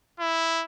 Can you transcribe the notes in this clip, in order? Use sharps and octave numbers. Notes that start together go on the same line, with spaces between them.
E4